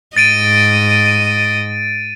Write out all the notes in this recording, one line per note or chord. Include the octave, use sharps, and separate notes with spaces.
G#2 D#5 A6 D7 D#7